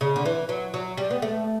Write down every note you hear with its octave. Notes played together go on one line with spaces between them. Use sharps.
C#3
D3
E3
F#3
F#3
G3
B3
A3